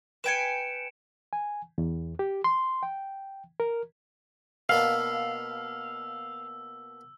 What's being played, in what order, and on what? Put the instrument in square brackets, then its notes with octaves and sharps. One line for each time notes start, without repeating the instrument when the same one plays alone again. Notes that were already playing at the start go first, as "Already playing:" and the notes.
[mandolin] B4 G5 G#5 [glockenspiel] C#7 D7 E7
[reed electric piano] G#5
E2
G4
C6
G5
A#4
[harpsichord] B2 A#3 D4 [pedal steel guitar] F5 [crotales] E6